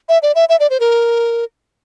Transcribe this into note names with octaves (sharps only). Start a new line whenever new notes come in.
E5
D5
E5
E5
D5
C5
A#4